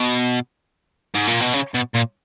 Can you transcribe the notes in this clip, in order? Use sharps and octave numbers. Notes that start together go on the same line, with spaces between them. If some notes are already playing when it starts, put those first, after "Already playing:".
Already playing: B2
G#2
A#2
B2
C#3
B2
A#2